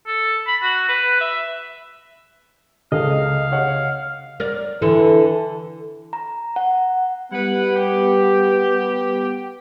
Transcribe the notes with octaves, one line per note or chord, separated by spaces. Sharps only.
A4
B5
F#4
B4
E5
C#2 C#3 G#4 A4 D#5 F5
C#5 F#5
A#4 D5
D3 E3 A4
A#5
F#5
G3 B3 E4 B4 F#5
G4